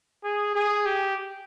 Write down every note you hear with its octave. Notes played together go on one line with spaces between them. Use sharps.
G#4
G#4
G4